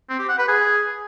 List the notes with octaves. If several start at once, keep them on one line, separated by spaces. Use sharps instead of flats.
C4
G4
F#5
B4
G#4